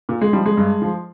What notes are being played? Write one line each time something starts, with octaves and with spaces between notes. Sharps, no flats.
A#2
G#3
F3 G3
G#3
G2
F3